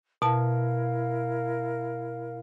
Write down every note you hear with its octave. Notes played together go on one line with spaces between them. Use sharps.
B2 E4 A#4 F5 A5